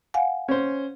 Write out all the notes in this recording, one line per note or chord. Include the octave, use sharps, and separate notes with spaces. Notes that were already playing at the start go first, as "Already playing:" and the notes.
F5 F#5 G#5
C#4 C5